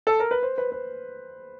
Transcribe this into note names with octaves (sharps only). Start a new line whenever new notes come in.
A4
A#4
B4
C5
B4
B4